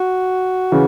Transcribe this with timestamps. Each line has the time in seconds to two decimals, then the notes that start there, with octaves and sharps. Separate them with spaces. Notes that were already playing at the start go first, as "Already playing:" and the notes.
Already playing: F#4
0.72 C#3 E3